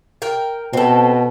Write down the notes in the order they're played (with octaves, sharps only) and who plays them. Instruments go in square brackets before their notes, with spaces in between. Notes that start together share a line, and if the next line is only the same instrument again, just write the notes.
[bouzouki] A#4 G5
[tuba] B2 [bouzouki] C4 A4